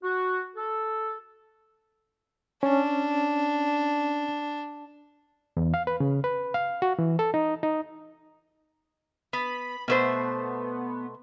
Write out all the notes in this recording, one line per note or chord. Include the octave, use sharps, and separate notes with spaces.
F#4
A4
C#4 D4
E2
F5
B4
C#3
B4
F5
F#4
E3
A4
D#4
D#4
B3 B5
B2 A3 B3 C5